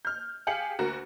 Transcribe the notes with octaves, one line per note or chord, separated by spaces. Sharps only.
F6 G6
G4 G#4 F5 C#7 F#7
D2 A#3 F#4 A#4